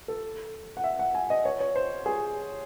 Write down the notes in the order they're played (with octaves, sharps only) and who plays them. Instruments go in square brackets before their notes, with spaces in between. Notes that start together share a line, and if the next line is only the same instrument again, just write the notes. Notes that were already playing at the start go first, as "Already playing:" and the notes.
[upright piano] A4
F#5
E5
F#5
G#5
D#5
C#5
C#5
C5
G#4